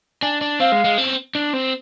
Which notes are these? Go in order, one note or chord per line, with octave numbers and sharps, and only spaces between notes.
D4 G#5
D4
C4 F5
G#3
G#3
C4
D4
C4